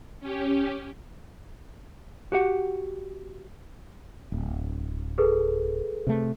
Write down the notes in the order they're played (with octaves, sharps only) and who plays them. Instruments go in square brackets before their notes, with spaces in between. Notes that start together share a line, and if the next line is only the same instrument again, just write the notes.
[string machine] C#4 G4
[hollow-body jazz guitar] F#4 G4 F#5
[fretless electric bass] D1
[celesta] G#4 A4 B4
[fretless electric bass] C3 A3